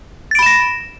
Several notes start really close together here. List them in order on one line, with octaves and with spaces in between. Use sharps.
A6 D7 B5 E7 A#6